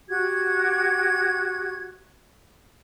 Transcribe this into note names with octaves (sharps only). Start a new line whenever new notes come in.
F#4 G4 G#6